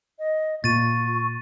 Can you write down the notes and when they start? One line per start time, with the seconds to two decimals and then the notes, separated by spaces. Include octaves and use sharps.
0.19 D#5
0.64 A#2 F4 C#6 A6 D#7